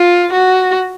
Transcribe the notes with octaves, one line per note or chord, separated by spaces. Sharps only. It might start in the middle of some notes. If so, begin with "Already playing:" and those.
Already playing: F4
F#4